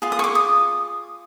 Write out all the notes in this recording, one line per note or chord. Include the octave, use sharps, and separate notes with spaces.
F4 G#4
D#6
C#6
D6
D#6